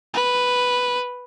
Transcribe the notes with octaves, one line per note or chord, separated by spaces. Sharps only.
B4